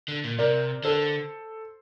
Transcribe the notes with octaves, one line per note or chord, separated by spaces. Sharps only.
D3
A#2
C3 A#4 D5
D3 A4 C5